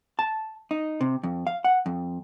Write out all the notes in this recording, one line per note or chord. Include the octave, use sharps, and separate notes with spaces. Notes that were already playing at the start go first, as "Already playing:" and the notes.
A5
D#4
C3
F2
F5
F#5
F2